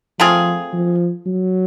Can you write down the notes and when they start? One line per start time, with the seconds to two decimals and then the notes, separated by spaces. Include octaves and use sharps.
0.19 F3 A3 C4 F4 G#4
0.73 F3
1.26 F#3